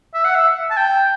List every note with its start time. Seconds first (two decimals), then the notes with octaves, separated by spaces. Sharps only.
0.14 E5
0.25 F#5
0.35 E5
0.71 A5
0.77 G5